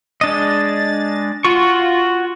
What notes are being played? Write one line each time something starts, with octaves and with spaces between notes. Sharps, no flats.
G#3 D4 D#5 A6
F4 F#4 C#6